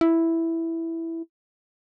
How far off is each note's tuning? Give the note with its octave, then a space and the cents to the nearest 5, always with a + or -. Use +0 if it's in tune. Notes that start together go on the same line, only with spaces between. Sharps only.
E4 +0